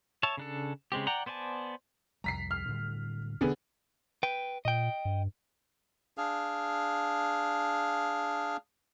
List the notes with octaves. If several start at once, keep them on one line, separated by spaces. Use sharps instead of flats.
C#5 E5 A5
C#3 D4 A4
C#3 G#3 C4 G4
D5 F#5 G5 A#5
B3 C5 D5 G#5 A5
C2 F2 G3 A#5 B6 C7
F6
A2 D3 G3
E1 D3 B3 C4 G#4
B4 G5
A#2 D#5 G5
G2
D4 G#4 F5